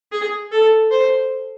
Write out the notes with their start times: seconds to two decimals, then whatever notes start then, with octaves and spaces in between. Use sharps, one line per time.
0.12 G#4
0.52 A4
0.91 C5